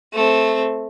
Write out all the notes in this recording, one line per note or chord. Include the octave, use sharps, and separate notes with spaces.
A3 C4